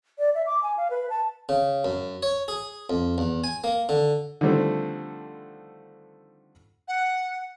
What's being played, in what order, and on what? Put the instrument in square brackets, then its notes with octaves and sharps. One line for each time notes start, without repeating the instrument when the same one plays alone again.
[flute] D5
E5
D6
G#5
F5
B4
A5
[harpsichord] C#3
F#2
C#5
G#4
F2
E2
G#5
A#3
D3
[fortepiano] D3 D#3 F3 G3 A3 C4
[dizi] F#5